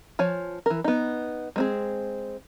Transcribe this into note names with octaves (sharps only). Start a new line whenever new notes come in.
F3 C#5 G#5
E3 A#4
B3 D#4
G#3 C4 G#4